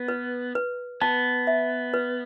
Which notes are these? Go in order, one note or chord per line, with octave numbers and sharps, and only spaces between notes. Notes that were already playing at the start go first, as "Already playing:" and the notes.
Already playing: B3
B4
B4
B3 A5
E5
B4